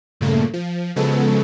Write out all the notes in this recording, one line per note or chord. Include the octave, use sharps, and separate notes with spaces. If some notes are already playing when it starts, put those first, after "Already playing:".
G2 A#2 C#3 A3 A#3
F3
C#3 F3 F#3 G#3 B3 A4